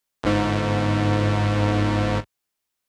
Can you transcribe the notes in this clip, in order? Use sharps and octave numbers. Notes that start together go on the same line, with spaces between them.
G1 G#2